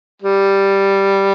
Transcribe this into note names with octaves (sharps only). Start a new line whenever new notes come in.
G3